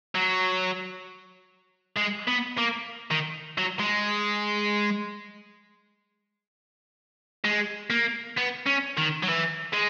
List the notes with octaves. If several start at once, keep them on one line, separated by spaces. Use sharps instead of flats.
F#3
G#3
B3
A#3
D#3
F#3
G#3
G#3
A#3
B3
C#4
D#3
F#3
E3
G#3